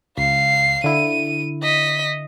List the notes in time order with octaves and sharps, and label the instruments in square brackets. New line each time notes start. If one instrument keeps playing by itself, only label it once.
[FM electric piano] C#2 [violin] F5 C7
[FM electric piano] D3 E4 [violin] D#7
[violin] D#5 B6